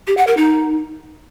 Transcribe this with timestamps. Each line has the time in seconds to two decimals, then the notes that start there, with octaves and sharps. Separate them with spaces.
0.07 G4
0.17 F#5
0.27 A#4
0.37 D#4